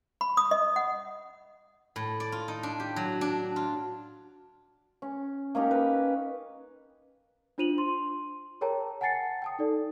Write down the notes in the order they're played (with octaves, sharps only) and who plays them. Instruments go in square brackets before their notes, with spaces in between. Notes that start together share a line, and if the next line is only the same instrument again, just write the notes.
[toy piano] B5
D#6
D#5
F#5
[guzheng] A2
D5
F4
D#4
D4
G4
F#3
D4
F4
[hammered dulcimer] C#4
A#3 C#4 D#4 G4
B4
[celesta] D4 F4 C5 D#7 F7 F#7
C6
G#4 A#4 C#5 G5 A5 A#5
F#5 G#5 A5 A6 C7 C#7
G5 A5 D#6
D#4 A4 D5